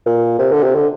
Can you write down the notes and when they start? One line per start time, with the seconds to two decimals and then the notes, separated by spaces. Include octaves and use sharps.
0.06 A#2
0.39 C3
0.52 D3
0.64 C3
0.75 D3